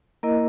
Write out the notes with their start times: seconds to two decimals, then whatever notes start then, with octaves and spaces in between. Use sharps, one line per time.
0.23 A#3 E4 A#4 D#5